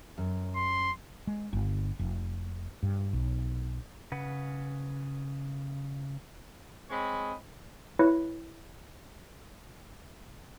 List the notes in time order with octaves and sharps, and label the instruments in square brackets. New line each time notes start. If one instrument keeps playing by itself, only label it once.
[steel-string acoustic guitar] F#2
[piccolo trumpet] C6
[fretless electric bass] G#3
G1
F1
G2
B1
[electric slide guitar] C#3 B4 F#5
[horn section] G#3 C4 C#5 D#5 B5
[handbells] E4 B4 C#5